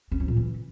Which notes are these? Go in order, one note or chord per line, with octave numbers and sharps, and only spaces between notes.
C#4
F3
A#2
E3